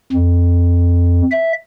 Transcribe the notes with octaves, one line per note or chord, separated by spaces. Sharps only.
F2
E5